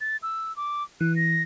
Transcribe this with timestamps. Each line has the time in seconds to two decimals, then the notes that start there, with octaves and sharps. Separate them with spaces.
0.01 A6
0.23 E6
0.56 D6
1.01 E3 F#6
1.16 A#6